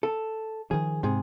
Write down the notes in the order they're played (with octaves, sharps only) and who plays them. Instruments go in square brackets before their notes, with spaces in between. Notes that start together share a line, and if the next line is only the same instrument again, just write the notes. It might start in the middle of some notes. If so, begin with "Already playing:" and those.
[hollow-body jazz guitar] A4
[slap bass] D#3 F3 [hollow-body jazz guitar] G#4
[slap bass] G#2 [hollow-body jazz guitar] C3 G#4